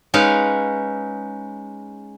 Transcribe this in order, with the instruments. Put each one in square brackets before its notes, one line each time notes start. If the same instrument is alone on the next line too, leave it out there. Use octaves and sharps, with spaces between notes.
[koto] G#3 C#4 D#4 B4 F5